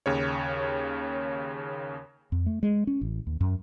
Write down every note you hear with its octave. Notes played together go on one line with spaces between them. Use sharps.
D#2 C#3 C#5
F2
A3
G#3
C#4
A1
D#2
F#2